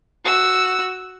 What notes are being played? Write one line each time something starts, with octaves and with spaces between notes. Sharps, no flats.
F#4 E6